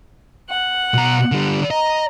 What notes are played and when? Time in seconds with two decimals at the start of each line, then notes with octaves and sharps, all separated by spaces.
0.49 F#5
0.94 B2 A#5
1.32 D3 G3
1.71 D#5 A#5